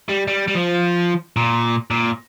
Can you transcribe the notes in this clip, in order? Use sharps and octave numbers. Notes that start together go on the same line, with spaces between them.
G3
G3
G3
F3
A#2
A#2